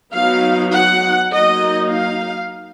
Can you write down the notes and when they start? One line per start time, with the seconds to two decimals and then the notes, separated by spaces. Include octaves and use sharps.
0.13 F#3 B3 D#4 F5
0.73 F#5
1.31 F#3 A#3 D#4 D#5
1.91 F5